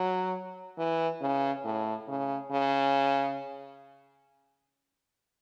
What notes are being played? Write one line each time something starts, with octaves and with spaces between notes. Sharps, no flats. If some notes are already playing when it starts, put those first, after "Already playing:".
Already playing: F#3
E3
C#3
A2
C#3
C#3